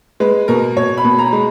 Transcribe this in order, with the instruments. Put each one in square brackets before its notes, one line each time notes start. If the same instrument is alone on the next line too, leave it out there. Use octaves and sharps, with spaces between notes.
[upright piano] G#3 B4
B2 A#4
B2 C#5
B5
B2
A#5
G#3